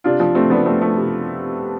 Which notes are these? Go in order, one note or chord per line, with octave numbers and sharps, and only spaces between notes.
C3 D4 F4
F3
C3 A3 C4
F3 B3 D4
C3 A3 C4
F3 A3
C3